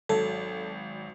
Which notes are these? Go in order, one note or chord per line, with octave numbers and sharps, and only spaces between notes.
G#1 F#3 A4